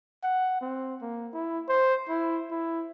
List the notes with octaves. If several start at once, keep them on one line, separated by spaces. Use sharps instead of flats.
F#5
C4
A#3
E4
C5
E4
E4